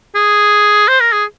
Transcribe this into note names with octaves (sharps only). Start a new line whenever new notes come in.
G#4
C5
A#4
G#4